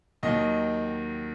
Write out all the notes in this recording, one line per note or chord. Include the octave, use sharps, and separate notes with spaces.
D#2 D#3 F#3 D#5